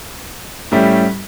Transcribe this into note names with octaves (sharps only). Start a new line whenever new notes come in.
A2 G3 C#4 E4 G4